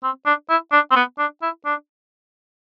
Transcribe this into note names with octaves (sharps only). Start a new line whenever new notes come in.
C4
D4
E4
D4
C4
B3
D4
E4
D4